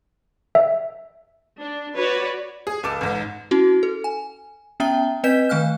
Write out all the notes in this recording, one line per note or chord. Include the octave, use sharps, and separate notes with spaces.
E5
D4
F#4 B4 C#5 D5
G#4
C#2 A4 D6 E7
A1 G#2
C#4 E4 F#4
A4
G#5
B3 C#4 E5 G5 A#5 G7
C4 B4 D#5 G6 B6 E7
D#3 A3 F5 G#5 F6 F#6